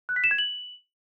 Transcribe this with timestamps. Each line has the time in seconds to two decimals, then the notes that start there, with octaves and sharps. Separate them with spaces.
0.09 F#6
0.16 B6
0.24 E7
0.31 G#6
0.38 F#7